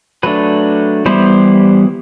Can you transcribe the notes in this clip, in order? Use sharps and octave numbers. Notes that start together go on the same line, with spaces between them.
F#3 A3 D4 B4
E3 G3 B3 E4 C5